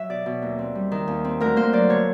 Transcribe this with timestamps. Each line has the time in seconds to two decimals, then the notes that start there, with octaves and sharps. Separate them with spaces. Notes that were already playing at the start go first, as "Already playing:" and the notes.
Already playing: F#3 E5
0.10 B2 D5
0.26 B2
0.42 D#2
0.59 C4
0.75 G3
0.92 D#3
1.08 D#2
1.25 C4
1.40 D2 A#4
1.56 A#3 C5
1.73 F#3 D5
1.89 D3 C#5